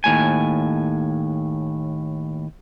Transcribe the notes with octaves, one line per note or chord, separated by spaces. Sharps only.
D#2 A2 G#5